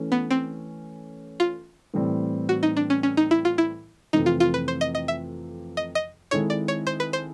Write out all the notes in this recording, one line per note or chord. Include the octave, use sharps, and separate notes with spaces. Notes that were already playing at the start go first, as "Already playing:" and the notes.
Already playing: E3 A3 C#4
B3
C4
F4
A2 E3 G3 C4
F#4
D#4
D4
C#4
C#4
D#4
E4
F4
E4
F2 C3 E3 A3 C4 D#4
F4
F4
B4
C5
D#5
D#5
E5
D#5
D#5
D#3 G#3 C4 E4 A4 C#5
D5
C#5
C5
B4
C5